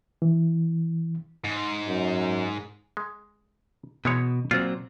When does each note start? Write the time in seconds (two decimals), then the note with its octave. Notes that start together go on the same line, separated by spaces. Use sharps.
0.22 E3
1.44 G#2
1.88 F#2
2.97 G#3
4.05 B2 E3 G#3 C#5
4.51 A#2 F#3 C4 F4